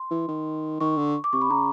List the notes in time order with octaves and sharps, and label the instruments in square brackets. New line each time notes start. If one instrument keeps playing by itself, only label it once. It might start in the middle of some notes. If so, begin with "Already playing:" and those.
Already playing: [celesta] C6
[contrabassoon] E3
D#3
[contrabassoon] D#3 [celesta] C#6
[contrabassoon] D3
[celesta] D6
[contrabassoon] C3 [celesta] C#6
[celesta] B5
[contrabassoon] C#3 [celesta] A#5